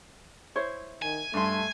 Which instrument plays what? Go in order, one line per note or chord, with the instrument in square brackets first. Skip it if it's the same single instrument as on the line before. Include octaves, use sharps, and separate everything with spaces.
[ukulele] E4 C5 C#5
[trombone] D#3 [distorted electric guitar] G#5
[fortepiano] G2 C6 [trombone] A3